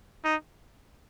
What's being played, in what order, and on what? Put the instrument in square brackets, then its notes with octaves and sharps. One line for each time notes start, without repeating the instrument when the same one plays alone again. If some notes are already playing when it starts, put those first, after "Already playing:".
[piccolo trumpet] D#4